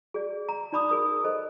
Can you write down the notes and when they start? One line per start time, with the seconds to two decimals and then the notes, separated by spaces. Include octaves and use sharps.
0.14 G#4 D5
0.49 A#5
0.72 D#4 D5 B5 D6 D#6
0.89 G#4 A#4 B5 D#6
1.24 A4 C5 D#5